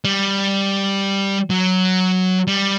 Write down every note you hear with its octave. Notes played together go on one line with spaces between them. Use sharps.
G3
F#3
G3